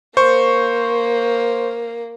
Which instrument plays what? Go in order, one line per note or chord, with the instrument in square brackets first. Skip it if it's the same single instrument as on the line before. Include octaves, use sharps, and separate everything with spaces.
[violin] A#3 [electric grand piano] C5 C#6